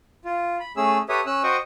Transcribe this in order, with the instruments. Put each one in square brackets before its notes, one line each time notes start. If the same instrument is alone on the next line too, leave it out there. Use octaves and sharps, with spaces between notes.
[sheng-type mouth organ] F4
B5
A3 C#4 G#4 E6
G4 A4 B4 C#5 E5 D#6
C#4 E6 F#6
F#4 C5 D#5 G5 C#6 D#6